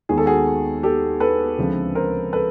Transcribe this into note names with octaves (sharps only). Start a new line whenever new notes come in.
D#2 D#3 G#3 B3 G#4
A4
F#4 G#4
G4 A4
A4 B4
D2 C#3 F3 G#3 C4
A#4 C5
A4 B4